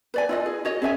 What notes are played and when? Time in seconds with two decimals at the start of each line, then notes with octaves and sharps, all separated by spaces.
0.14 B4 D5 G#5
0.29 E4 F4 D#5
0.46 G#4
0.65 F#4 C#5 D#5
0.82 C#4 G#4 E5 G#5